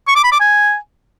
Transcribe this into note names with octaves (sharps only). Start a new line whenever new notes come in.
C#6
D6
B5
D6
G#5